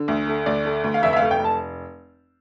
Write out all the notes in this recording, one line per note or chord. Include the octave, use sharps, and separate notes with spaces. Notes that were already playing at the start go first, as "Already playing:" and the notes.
Already playing: D3
D2
A3
D2 D5
A3
D2
F5
F1 E5
E5
A3 F5
G5
F1
A5